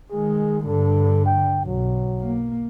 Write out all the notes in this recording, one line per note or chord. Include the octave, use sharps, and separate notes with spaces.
D#3 G#3 G#4
G2 D3 A4
G5
B1 F#3
A#3